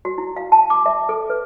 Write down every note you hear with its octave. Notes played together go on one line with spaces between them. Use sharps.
F#4
E4
F5
A5
D6
E5
A4
B4